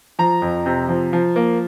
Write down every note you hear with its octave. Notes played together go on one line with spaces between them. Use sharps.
F3 A#5
F2
C3
F3
F3
A#3